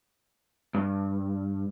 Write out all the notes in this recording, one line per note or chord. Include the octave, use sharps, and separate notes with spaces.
G2